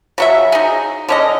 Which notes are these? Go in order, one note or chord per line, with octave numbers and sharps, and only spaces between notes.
C#3 F#3 E5
D#4 G#4
D3 C#4 D#5